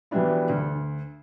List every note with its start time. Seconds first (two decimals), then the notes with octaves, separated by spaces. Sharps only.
0.11 E3 F#3 G3 B3 D4 E4
0.49 D2